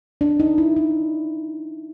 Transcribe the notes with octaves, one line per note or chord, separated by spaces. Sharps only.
D4
D#4
E4
D#4